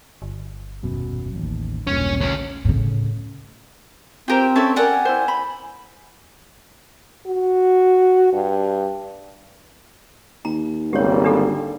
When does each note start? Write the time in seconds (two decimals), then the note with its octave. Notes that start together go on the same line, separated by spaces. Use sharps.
0.22 G1
0.83 D#1 F#2 B2
1.34 A1 D#2
1.87 E1 B1 G2 A#2 C#4
2.20 D2 C#4
2.65 A2 C#3
4.28 C4 F4 G4 A#4 C5 G5
4.56 C#4 A4 C#5 E5 A5
4.76 G4 A#4 D5 F#5 G#5 A5
5.05 E4 C5
5.28 B5
7.27 F#4
8.33 G2
10.45 D#2 A#5
10.93 G#1 C#2 G3 A#3 G4 C#5
11.24 D3 D4 G4 A4